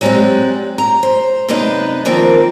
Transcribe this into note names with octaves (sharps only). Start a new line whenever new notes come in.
F#3 G#3 C4 G4 D5 F#5
A#5
C5
F#2 C3 B3 D4 D#4 B4
D#3 F3 A#3 C4 A#4 D5